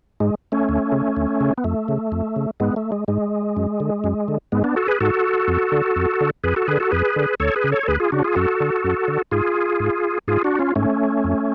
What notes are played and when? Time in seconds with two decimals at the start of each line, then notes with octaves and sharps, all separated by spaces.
0.20 G#2 G#3
0.52 A3 C#4
0.69 D2
0.92 C#3
1.17 D2
1.41 C#3
1.58 B3
1.64 F2 A3
1.88 C#3
2.12 F2
2.36 C#3
2.60 G#2 G#3 B3
2.76 A3
2.92 G#3
3.08 G#2 G#3
3.57 F#2
3.80 D3
4.04 F#2
4.28 D3
4.52 G#2 G#3 B3
4.64 B3 D4
4.76 F#4 A4
4.88 G#4 B4
5.00 G#2 F#4 A4
5.48 F2
5.72 D3
5.96 F2
6.21 D3
6.44 F2 G#4 B4
6.56 F#4 A4
6.68 D3 G#4 B4
6.80 F#4 A4
6.91 F2 G#4 B4
7.16 D3
7.40 D2 A4 C#5
7.56 G#4 B4
7.64 C#3
7.72 A4 C#5
7.83 A4
7.88 D2 G#4 B4
8.00 F4 G#4
8.12 C#3 D4 F#4
8.24 F4 G#4
8.35 F#2 F#4 A4
8.60 D3
8.84 F#2
9.08 D3
9.31 G#2 F4 G#4
9.80 G#2
10.28 G#2 F4 G#4
10.44 D4 F#4
10.59 C#4 F4
10.76 G#2 A3 C#4
11.24 F2